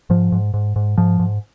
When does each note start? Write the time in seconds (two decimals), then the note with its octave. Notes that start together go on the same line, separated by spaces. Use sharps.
0.10 G#2 F3
0.32 G#2
0.54 G#2
0.76 G#2
0.98 G#2 F3
1.19 G#2